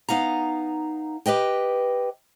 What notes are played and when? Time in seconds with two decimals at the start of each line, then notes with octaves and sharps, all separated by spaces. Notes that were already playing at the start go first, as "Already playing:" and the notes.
0.09 B3 D#4 F5 A#5
1.26 G4 B4 D#5 G5